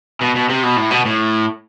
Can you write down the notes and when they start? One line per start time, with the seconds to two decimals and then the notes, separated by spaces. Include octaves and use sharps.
0.21 B2
0.35 B2
0.49 C3
0.63 B2
0.76 A2
0.91 B2
1.05 A2